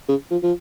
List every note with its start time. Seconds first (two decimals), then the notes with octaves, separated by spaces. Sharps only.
0.09 C#3
0.31 F3
0.43 F3